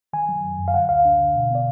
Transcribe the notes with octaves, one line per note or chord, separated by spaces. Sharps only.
D#3 G#5
F#3
F#2
F#2
F5
D3 F#5
D2 F5
D4
D3
B2
B3 D5